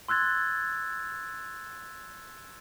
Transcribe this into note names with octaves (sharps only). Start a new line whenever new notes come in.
C6 E6 F#6 G#6 A6